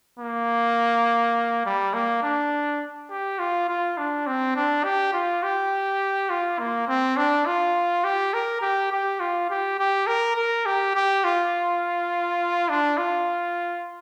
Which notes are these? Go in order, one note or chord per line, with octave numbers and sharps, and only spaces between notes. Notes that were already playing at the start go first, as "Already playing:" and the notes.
A#3
G3
A#3
D4
G4
F4
F4
D4
C4
D4
G4
F4
G4
F4
A#3
C4
D4
F4
G4
A#4
G4
G4
F4
G4
G4
A#4
A#4
G4
G4
F4
D4
F4